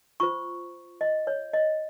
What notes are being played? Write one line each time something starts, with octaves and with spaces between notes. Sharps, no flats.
F4 C5 C#6
D#5
C#5
D#5